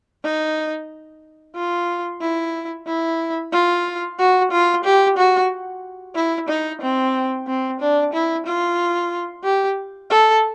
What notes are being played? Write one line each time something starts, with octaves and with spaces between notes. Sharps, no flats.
D#4
F4
E4
E4
F4
F#4
F4
G4
F#4
E4
D#4
C4
C4
D4
E4
F4
G4
A4